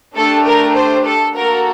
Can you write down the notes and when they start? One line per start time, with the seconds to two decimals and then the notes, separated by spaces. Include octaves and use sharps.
0.16 A3 D4 G4 A4
0.46 A#4
0.76 C5
1.06 A4
1.35 A#3 F#4 A4 A#4